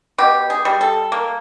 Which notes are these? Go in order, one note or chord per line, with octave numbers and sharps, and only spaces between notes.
B2 G4
G#4
G3
A4
A#3